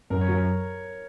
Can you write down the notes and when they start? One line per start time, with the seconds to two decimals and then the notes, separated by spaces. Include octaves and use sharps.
0.10 F#2 A#4
0.21 C#5
0.28 F#3 A#4